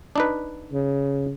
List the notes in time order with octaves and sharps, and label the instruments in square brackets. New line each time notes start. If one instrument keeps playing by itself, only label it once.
[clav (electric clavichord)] D4 D#4 B4
[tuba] C#3